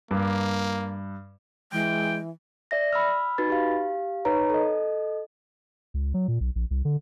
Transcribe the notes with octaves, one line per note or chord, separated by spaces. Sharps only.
G2 A#3
E3 G#3 G5
D5 E5 A#6
B5 E6 F6
D#4 F#4 B4 B5 A6
G4 F5
D#4 B4 C#5 A#5
A4 D#5
C#2
F#3
A#2
B1
A#1
C2
D3